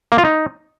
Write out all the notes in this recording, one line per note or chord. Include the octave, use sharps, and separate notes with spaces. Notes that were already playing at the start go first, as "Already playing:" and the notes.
A#3
F4
D#4